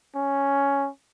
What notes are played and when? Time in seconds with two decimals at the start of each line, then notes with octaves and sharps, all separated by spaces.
0.15 C#4